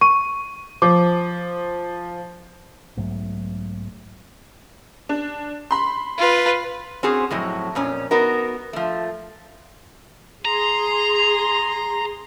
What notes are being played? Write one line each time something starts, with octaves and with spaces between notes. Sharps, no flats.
C#6 D#7
F3 D6
B1 G#2 F#3 A3
D4
B5 C6
F4 B4
C4 C#4 F#4 G#4 C5
F2 A2 F#3
F2 A#2 C#4
B3 D#4 F#4 A#4
F3 A3
G#4 A#5 C6